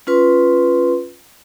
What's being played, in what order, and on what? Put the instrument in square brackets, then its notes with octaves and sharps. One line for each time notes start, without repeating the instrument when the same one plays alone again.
[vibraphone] C#4 F4 B4 C6